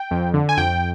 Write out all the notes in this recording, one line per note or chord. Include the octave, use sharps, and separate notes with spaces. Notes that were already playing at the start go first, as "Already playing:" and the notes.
Already playing: G5
F2
D3
G#5
F2 G5